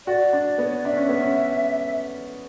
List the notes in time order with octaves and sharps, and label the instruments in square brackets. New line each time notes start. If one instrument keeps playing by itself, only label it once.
[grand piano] F#4 [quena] D5
[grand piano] D4
[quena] D5
[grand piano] B3
[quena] C#5
D5
[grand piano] D4 [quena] E5
[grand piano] C#4
B3
C#4